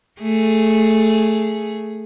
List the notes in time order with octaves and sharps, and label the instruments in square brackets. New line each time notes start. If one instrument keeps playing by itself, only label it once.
[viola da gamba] A3 G#4